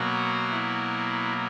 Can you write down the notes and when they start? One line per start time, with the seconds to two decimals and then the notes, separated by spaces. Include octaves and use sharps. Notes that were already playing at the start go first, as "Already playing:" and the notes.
Already playing: B2 F#3 A#3 F#4
0.51 E4